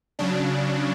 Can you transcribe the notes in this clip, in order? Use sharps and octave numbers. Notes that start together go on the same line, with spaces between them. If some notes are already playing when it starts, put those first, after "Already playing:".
C#3 F#3 D4